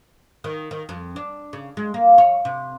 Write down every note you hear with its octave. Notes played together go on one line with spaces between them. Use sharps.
D#3
D#3
F2
D4
C#3
G#3
A#3
C#5
C3